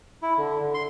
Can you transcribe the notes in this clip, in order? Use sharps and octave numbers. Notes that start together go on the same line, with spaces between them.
E4
D3
D3
C6